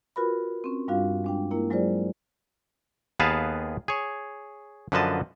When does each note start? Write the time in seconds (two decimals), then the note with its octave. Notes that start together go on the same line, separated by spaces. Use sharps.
0.16 F4 F#4 A#4 B4 B5
0.64 C4 C#4
0.88 G2 G3 D4 F4 F#4 F5
1.24 G#3 D4 G5
1.51 A#3 E4 A#4
1.70 F#3 G#3 F4 G#4 C5 D5
3.20 D#2 B3 G#4 B4 F5 A5
3.88 G#4 C#5
4.92 F#2 D3 F3 B4 D#5 A5